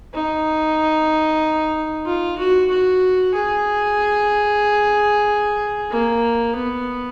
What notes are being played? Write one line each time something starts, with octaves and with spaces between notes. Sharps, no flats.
D#4
F4
F#4
F#4
G#4
A#3
B3